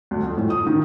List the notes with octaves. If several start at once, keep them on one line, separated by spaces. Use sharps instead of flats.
D2
F2
A2
D#6
D#3